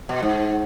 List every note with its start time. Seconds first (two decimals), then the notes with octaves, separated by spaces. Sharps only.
0.09 B2
0.23 G#2